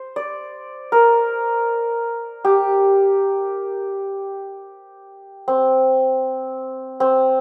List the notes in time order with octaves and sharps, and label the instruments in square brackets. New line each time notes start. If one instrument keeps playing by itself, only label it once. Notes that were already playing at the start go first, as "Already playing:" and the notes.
Already playing: [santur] C5
D5
A#4
G4
C4
C4